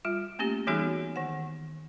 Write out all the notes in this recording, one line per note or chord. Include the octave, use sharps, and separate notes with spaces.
G3 F4
A3 A#3 C#4 G4
E3 G3 B3 D#4 F#4 G#4
D#3 F#5